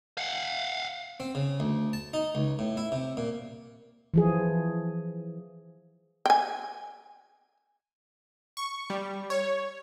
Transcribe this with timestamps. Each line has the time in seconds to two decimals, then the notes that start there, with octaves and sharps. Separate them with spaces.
0.18 F5 F#5
1.20 C4
1.35 C#3
1.60 D2
1.93 A5
2.14 D#4
2.35 C#2
2.59 A2
2.77 E4
2.92 C3
3.17 A#2
4.14 E3 F3 G#4
6.26 G5 G#5
8.57 C#6
8.90 G3
9.30 C#5